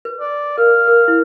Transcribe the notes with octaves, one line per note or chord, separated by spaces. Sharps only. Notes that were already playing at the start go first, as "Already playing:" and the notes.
B4
D5
A#4 F5
A#4
E4